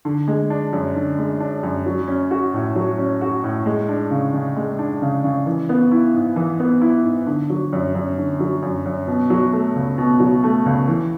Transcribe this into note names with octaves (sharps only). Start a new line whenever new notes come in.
D3
G#3
D4
F#2
D3
G#3
D4
F#2
F#3
C#4
F#4
A2
F#3
C#4
F#4
A2
G#3
D4
C#3
C#3
G#3
D4
C#3
C#3
E3
B3
E4
G#2
E3
B3
E4
G#2
D3
F#3
F#2
F#2
D3
F#3
F#2
F#2
B2
F#3
A3
C#2
B2
F#3
A3
C#2
E3